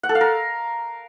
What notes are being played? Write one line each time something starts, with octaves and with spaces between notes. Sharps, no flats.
F#5
A4
F5
A#4